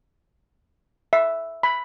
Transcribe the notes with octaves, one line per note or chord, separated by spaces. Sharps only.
E5
B5